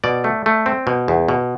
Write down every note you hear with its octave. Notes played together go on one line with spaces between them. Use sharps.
B2 D5
A3
A3
C4
B2
E2
B2